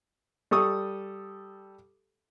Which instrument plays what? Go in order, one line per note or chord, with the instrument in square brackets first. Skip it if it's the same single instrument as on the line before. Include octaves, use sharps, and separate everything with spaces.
[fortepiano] G3 A4 C#6 D#6